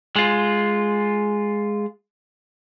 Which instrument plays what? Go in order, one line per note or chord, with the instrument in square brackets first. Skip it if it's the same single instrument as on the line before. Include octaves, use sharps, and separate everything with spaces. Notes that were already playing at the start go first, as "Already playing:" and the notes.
[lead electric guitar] G#3 F4